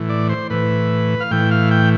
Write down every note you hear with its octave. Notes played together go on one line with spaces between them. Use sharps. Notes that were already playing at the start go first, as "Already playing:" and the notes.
Already playing: A2 E3
D5
C5
A2 E3 B4
F5
A2 E3 G5
F5
G5